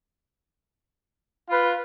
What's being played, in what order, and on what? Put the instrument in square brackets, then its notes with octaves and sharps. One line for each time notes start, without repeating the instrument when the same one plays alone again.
[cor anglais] F4 [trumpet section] B4 F5 B5